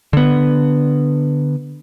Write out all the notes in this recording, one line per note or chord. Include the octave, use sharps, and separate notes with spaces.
D3 B3